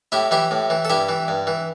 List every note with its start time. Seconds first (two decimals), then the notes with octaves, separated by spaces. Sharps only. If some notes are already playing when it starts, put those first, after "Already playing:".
0.12 A2 E4 G4
0.31 E3 E4 G4
0.51 A2
0.70 E3
0.85 A4
0.90 G2 E4 G4
1.09 E3
1.28 G2
1.47 E3